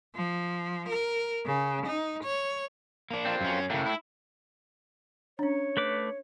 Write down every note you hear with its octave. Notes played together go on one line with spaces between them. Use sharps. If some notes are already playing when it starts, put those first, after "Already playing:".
F3
A#4
C#3
D#4
C#5
A#3 D4
C4 F4
F#2 C#4
A2 C#3 A#3
E4
C#4 D4 C#5
A3 B4 D6